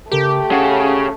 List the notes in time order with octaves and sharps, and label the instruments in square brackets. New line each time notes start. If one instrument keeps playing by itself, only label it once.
[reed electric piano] C#3 A4 A#4 [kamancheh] A3 [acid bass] G4
[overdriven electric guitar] C#3 [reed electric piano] F#5